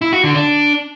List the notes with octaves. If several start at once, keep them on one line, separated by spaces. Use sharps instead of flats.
E4
F#4
D3
D4